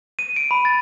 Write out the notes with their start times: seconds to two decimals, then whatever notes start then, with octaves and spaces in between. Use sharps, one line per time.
0.19 D#7
0.36 D7
0.51 B5
0.65 A6